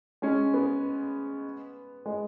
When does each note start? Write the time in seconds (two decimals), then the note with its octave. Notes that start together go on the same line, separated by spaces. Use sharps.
0.22 G#3 C#4
0.54 B3
2.06 G#3